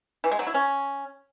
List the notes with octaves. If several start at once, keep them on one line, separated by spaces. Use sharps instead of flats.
E3
G#3
F#3
E4
C#4